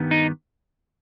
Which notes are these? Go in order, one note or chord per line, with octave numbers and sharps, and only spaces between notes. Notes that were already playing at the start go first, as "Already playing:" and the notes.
Already playing: G2 D#3 G3 B3
D#4